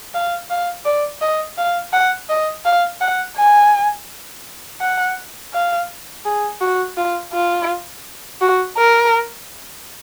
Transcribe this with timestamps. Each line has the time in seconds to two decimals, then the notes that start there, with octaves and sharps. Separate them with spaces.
0.14 F5
0.50 F5
0.85 D5
1.21 D#5
1.58 F5
1.93 F#5
2.29 D#5
2.65 F5
3.01 F#5
3.37 G#5
4.81 F#5
5.54 F5
6.25 G#4
6.61 F#4
6.97 F4
7.33 F4
8.41 F#4
8.77 A#4